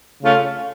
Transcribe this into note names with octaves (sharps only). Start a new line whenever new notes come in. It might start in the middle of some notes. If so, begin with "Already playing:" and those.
C#3 A3 C#4 F4